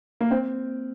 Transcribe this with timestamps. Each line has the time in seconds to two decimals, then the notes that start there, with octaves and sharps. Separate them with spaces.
0.21 A#3
0.31 C4